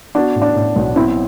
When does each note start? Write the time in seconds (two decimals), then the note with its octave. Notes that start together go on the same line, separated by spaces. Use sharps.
0.15 B3 D4 F#4
0.35 A2
0.42 D4
0.55 A2
0.76 B1
0.96 B3 C4 E4